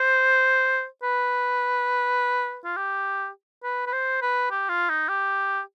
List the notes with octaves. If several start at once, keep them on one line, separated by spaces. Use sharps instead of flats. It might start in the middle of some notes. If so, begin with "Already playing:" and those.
Already playing: C5
B4
F4
G4
B4
B4
C5
B4
G4
F4
D#4
G4